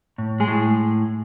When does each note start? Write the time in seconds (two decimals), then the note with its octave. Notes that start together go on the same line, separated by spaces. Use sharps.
0.18 A2
0.40 G#3 G#4
0.48 A2